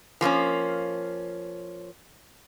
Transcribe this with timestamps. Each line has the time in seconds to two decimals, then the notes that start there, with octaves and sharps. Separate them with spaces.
0.21 F3 A#3 C4 C#4